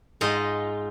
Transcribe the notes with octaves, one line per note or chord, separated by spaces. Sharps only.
G#2 F4 D#5